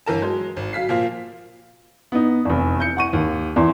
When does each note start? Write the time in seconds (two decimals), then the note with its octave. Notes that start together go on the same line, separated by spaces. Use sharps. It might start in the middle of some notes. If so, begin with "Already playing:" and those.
0.06 G1 E3 A#4 A5
0.22 F#3 G#3
0.57 G#1
0.73 F#3 F5 B6 C7
0.89 A#2 F3 A#3 F4
2.12 B3 D#4
2.45 F1 E2
2.80 G6 C#7
2.97 F#5 C#6 D#7
3.13 D#2
3.56 E2 E3 C6